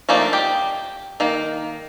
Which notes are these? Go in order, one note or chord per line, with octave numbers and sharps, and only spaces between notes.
F3 A3 A#3 D4 D#4
G4
D#3 A#3